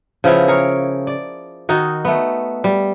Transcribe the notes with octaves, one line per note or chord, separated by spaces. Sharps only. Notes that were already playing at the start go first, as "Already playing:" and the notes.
C#3 F3 B3 E4
G#4 A#4 C#5
D5
D#3 D#4 F#4
A3 B3
G3